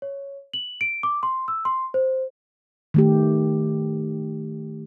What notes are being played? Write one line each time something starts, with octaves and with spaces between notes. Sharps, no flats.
C#5
F#7
D7
D6
C6
E6
C6
C5
D#3 A3 G4